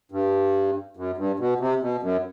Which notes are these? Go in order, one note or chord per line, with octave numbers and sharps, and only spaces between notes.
G2
F#2
G2
B2
C3
B2
F#2